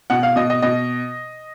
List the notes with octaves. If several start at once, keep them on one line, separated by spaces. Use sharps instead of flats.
B2 F#5
F5
B2 D#5
D#5
B2 D#5